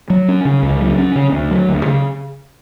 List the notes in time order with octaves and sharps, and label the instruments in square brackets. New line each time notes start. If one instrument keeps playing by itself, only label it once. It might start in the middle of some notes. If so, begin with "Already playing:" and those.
[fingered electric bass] F#3
C#4
C#3
C#2
F#3
C#4
C#3
D2
F#3
D2
C#3